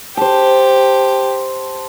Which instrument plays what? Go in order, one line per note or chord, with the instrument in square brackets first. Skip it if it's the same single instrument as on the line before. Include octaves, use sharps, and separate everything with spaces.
[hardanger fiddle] G4 [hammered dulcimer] C5 A5